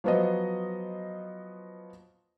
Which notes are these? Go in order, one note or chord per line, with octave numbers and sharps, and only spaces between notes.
F3 F#3 B3 C5 D#5